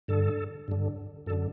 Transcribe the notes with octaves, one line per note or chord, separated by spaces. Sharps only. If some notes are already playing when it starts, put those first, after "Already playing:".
G2 D3 A4
G2 D3
F#2 D3 A4